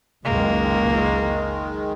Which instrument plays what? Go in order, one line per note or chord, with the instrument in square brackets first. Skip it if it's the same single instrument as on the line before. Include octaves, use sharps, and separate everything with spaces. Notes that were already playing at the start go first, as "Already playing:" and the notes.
[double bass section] F#1 C#2 [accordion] D#3 G#3 [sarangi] A#3